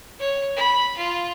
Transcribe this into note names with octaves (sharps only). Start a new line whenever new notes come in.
C#5
B5
F4